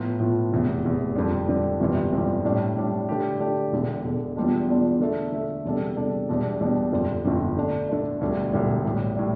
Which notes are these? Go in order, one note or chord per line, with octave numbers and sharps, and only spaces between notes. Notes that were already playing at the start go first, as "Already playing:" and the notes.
Already playing: A2 F3 B3 F4
A2 F3 B3 F4
F1 E2 C3
F1 E2 C3
F2 D3 G3
F2 D3 G3
G1 F2 C3 E3 G3
G1 F2 C3 E3 G3
A2 G3 D4
A2 G3 D4
D3 A3 D4 G4
D3 A3 D4 G4
E1 E2 D3
E1 E2 D3
E2 B2 G3 D4 F4
E2 B2 G3 D4 F4
D3 A3 D4 A4 E5
D3 A3 D4 A4 E5
E2 C3 G3 D4 A4
E2 C3 G3 D4 A4
E1 E2 B2 G3 D4
E1 E2 B2 G3 D4
G1 F2 D3 G3
G1 F2 D3 G3
D3 A3 D4
D3 A3 D4
E1 D2 D3 G3
E1 D2 D3 G3
A1 A2 G3
A2 G3